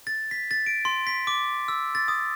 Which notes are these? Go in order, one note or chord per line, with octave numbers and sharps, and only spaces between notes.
A6
B6
A6
D7
C6
B6
D6
E6
A6
D#6